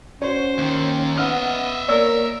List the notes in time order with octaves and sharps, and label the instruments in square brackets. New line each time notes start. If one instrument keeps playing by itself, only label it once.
[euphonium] C#4 [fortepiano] F#4 C#5 [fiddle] C5
[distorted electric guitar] D#2 D#3
[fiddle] B3 [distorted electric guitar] D#5 E5 [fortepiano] F#5 F6
[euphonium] A#3 [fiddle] A#4 [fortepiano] C#5 D5 E6